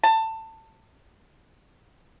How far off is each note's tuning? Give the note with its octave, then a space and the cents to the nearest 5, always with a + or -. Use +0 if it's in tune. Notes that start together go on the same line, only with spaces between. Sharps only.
A5 +20